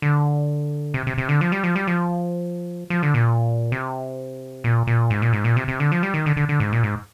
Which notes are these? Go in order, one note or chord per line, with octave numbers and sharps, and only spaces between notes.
D3
C3
C3
C3
D3
F3
G3
F3
G3
F3
F3
D3
A#2
C3
A#2
A#2
G#2
A#2
G#2
A#2
C3
C3
D3
F3
G3
D#3
D3
D3
D3
G#2
A#2
G#2